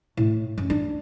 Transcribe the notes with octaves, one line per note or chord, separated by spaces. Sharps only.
A2
F#2
D4